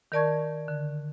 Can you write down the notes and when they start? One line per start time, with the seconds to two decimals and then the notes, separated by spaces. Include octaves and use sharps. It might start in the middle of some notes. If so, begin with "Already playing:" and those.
0.12 D#3 A#4 D5 A5 C#6 G#6
0.68 D3